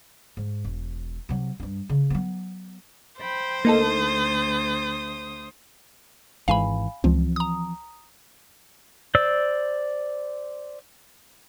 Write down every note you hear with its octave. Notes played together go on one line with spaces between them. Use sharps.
G#2
E1
C3 F#3
G2 C#4
C#3
F#3 B3
C5 G5 B5
D2 A#3 D#4 A4 D#6
G#1 G#2 E3 F5 G#5 B5
C#2 E3 F3 C4
A#5 D#6
C5 D5 E6